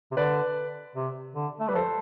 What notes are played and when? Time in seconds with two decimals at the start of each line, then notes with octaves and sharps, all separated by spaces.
0.12 C3
0.17 D3 B4 D5
0.96 C3
1.35 D3
1.60 A3
1.68 G3 B4
1.75 F3 A4 C5